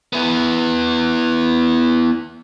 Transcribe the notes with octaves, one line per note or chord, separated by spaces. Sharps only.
B3 E4